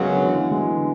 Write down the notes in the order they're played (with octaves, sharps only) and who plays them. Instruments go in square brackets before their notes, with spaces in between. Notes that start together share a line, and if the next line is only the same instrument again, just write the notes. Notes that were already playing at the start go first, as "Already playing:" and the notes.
Already playing: [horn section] F#2 C#3 F#3 [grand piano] G#3 B3
[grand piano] D3
E3
F#3
E3 G#3
D3